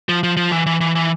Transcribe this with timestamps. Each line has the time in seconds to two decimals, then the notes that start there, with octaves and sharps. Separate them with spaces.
0.09 F3
0.23 F3
0.37 F3
0.52 E3
0.66 E3
0.81 E3
0.95 E3